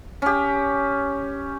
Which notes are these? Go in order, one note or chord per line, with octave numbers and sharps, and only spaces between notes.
C#4 G4